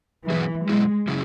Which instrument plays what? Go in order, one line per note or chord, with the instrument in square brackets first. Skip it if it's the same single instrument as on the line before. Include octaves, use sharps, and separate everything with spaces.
[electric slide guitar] B2 F#3 B3 E4 G#4 [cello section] E3
[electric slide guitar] B2 F#3 B3 E4 G#4 [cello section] G#3
[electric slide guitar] C#3 F#3 C#4 E4 G#4